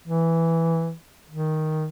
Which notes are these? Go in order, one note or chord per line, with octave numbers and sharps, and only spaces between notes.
E3
D#3